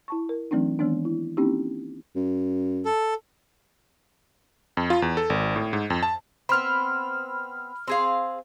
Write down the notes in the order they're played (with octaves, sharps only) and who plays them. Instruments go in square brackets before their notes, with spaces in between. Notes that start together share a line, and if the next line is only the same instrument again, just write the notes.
[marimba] E4 A5 C#6
A#4
E3 F#3 A3 C4 D4 D#4
D#3 E3 G#3 B3 D4
E4
A#3 C4 C#4 D#4 E4 G4
[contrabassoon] F#2
[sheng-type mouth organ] A4
[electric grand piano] F2
F4
E2
A4
G#1
A2
G#2
F2
A5
[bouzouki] B3 C4 [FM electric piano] B5 F6
[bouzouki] C4 G#4 F5